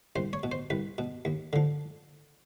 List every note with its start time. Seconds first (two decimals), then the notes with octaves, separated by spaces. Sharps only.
0.16 C2 C5
0.33 C#5
0.43 B2
0.52 C5
0.70 C2 B4
0.98 B2
1.25 D#2
1.53 D3 F3